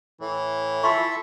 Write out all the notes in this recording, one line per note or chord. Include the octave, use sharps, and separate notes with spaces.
A2 E3
E4 F4 A4 E5 C6 C#6